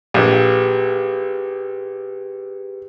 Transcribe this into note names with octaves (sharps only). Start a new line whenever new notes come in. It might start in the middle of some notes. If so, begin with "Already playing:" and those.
A#1 G4 G#4 B4